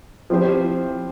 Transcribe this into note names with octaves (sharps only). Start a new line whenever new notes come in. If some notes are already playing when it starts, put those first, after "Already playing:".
F3 C4 E4 G4 C5